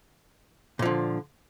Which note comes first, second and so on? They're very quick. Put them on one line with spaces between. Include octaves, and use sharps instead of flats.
A#2 F3 D3